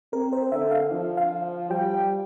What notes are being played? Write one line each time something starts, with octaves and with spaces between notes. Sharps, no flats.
C4 A#4
C5
D3 E5
F5
F3
F5
G3 G5